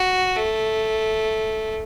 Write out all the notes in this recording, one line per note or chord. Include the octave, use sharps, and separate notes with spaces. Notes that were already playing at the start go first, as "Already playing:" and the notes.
Already playing: F#4
A3